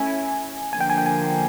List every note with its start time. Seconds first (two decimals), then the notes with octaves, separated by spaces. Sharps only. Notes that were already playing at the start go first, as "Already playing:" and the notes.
Already playing: A3 C#4 E4 G#5
0.73 D3 F3 A#3 G#5
0.81 G5
0.90 G#5
0.98 G5
1.06 G#5